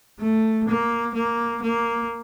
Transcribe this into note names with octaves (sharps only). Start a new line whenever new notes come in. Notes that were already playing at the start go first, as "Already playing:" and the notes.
A3
A#3
A#3
A#3